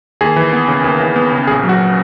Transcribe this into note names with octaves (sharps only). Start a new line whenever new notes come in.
D#2 G#4
E3
B3
C#3
D#2
E3
B3
C#3
A#1 G#4
F#3
F#4